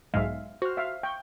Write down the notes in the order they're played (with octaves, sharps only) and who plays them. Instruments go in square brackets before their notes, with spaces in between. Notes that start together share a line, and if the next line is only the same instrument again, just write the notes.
[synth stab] B1 G#2 G#3 [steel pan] E5 F5
[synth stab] F#4 F6 [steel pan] C5
[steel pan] E5 F5
[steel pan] G5 [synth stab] C#6